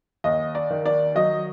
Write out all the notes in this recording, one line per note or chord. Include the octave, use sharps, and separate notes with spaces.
D#2 D#5
D5
D#3
D5
F#3 D#5